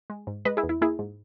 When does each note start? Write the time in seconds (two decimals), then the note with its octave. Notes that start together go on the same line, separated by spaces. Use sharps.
0.10 G#3
0.27 G#2
0.45 G#3 B4 D#5
0.57 E4 G#4
0.63 E2
0.69 E4
0.81 A#3 E4 G#4
0.99 G#2